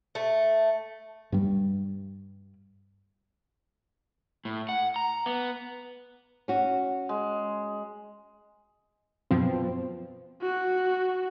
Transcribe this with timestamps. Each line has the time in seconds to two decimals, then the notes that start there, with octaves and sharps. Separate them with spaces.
0.15 A3
1.32 G2 G3
4.45 A2
4.69 F#5
4.96 A#5
5.26 B3
6.48 C#4 F#4
7.09 G#3
9.31 F#2 B2 F3 C4
10.42 F#4